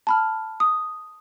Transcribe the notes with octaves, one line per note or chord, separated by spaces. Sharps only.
A5 B5 F6
D#6